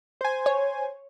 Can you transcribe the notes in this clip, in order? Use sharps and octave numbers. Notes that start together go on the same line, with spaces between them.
C5 G#5
C#5